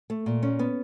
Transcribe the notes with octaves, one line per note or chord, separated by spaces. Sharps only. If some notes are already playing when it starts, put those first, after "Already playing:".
A3
A#2
C#4
B3